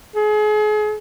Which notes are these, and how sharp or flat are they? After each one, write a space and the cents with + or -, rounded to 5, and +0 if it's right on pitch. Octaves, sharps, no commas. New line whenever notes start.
G#4 +35